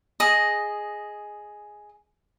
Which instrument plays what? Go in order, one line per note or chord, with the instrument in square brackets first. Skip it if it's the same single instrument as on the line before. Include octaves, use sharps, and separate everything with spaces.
[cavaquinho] G#4 D#5